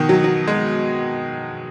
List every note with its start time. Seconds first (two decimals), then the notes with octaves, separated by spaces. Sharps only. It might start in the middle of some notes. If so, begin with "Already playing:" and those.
Already playing: B2 D#3
0.09 F#3
0.24 F#3
0.48 G#3